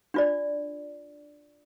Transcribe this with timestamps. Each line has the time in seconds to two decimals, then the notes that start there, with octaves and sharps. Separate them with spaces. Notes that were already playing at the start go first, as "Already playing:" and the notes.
0.14 D4 F4 D5